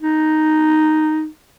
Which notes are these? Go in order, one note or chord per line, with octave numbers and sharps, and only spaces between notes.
D#4